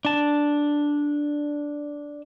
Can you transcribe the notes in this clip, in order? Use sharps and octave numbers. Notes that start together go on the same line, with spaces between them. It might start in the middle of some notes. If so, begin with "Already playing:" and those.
D4 A5